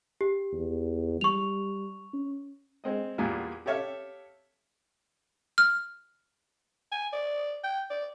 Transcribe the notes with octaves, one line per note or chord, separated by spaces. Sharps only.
G4
E2
G3 C#6 F7
C#4
G#3 C4 D#5
E2 A#2 E3 G3 F4 G#5
G4 A4 C#5 E5 F5
F6
G#5
D5
G5
D5